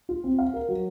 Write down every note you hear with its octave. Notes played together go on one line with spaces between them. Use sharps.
F4
C4
F5
A#4
F#3